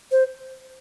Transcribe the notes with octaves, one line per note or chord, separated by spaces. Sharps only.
C5